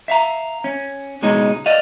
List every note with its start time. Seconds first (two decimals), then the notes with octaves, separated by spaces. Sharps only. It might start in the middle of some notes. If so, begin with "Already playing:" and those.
0.08 E5 F5 A#5
0.64 C#4
1.22 C#2 B2 G#3 C#4 D#4
1.66 D5 D#5 F5